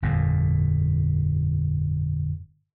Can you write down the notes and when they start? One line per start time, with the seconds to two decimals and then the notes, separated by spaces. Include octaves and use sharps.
0.02 G1 F2 A#2